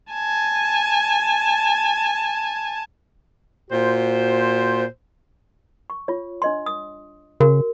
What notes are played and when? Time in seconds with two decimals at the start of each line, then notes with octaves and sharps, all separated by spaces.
0.12 G#5 A5
3.71 A#2 F#4 C5
5.90 C#6
6.08 F4 C#5
6.42 D4 D#5 C6
6.66 D#6
7.40 C#3 F#4 A#4